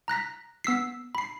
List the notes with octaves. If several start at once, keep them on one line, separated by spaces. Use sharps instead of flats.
A#5 F#6 A#6 B6
B3 E6 B6 C7
B5 C7